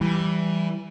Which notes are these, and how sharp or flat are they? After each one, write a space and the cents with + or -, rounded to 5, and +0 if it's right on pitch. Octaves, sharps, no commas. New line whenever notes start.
E3 +10 G3 -10